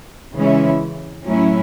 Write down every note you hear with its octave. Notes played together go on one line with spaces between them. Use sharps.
C#3 E3 G#3 C#4 E4
A2 F#3 C#4 E4